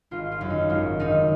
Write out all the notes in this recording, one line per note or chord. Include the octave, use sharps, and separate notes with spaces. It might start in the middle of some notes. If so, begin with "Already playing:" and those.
G#1 F4
F4
F#2 D#3
D#4
G#1 F4
F#2 D#3 D#4